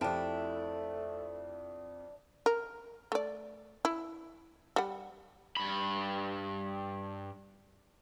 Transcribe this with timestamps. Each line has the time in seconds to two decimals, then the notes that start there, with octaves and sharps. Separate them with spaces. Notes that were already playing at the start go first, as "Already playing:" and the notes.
0.01 F2 A3 D4 E4 F4 G4 G5 A5
2.46 A#4
3.12 A3 D5
3.85 E4
4.76 G3 F#5
5.57 G2 B5